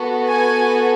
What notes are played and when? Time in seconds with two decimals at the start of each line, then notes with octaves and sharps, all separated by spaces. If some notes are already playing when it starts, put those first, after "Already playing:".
Already playing: B3 F#4 A4
0.28 G#5